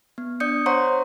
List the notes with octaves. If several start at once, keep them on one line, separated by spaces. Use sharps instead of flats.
B3
D4 D5 D#6 G6 C#7
C5 C#5 F#5 A#5 C6 C#6